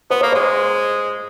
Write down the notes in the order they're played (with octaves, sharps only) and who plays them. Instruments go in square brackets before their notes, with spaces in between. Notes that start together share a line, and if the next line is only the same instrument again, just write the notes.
[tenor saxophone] B3 [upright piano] C5
[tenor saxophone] A#3 [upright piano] C#5
[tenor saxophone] G#3 [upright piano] C5